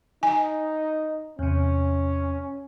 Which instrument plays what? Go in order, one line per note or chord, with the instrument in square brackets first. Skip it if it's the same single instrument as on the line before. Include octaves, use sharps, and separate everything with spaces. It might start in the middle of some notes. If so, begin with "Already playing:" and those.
[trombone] D#4 [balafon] G#5
[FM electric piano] E2 C3 [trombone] C#4